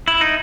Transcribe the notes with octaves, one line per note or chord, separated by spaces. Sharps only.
E4
D#4